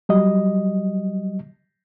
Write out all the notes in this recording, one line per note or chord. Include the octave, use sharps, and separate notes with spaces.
F#3 G3 D#5